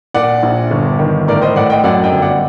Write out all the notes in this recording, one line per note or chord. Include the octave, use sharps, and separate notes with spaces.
A#2 D5 F#5
A#1
G1
D#3
A2 A#4 D5
C5 D#5
A2 D5 F#5
D#5 G5
F#2 D5 F#5
D#5 G5
G1
D5 F#5